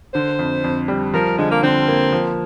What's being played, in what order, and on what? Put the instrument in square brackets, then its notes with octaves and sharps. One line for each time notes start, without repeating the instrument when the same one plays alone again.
[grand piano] D3 [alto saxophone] C5
[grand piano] F2
F2
G3
[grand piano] F3 [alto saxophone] A#4
[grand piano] D3 [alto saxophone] G#3
[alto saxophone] A#3
[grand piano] D3 [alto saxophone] C4
[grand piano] A#3
F3